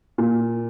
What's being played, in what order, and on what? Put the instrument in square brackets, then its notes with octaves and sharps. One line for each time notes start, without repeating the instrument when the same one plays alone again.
[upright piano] A#2